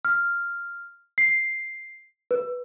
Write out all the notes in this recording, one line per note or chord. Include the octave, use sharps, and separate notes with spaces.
F6
C7
B4